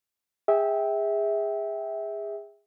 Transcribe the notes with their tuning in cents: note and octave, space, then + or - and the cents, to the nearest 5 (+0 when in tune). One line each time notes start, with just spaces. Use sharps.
G#4 -25 E5 -20 G5 +0